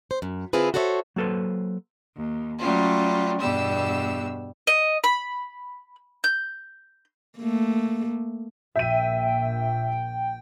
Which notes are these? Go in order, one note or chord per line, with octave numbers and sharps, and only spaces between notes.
C5
F#2
D3 C4 E4 F4 G#4 B4
F#4 A4 C5 C#5 D#5 E5
F#3 A#3 A4 B4 C5
D#2
F#3 G3 A3 C#4 F4
E2 G2 B2 G3 E6
D#5
B5
G6
A3 A#3
A#1 E5 G5 D#7